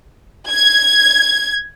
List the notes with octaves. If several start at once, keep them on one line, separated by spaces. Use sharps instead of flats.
G#6